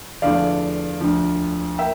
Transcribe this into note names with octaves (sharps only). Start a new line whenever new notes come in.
E2 D3 F3 A3 D5 F5
D2 D3 F3
A#3 E5 G5